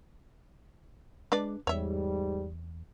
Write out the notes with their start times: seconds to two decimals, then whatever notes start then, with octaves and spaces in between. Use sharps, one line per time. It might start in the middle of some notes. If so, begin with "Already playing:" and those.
1.32 G#3 D4 B4 D5
1.67 E2 G#2 G3 C#5 E5